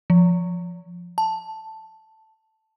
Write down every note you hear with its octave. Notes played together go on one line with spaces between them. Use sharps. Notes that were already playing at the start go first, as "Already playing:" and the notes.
F3
A5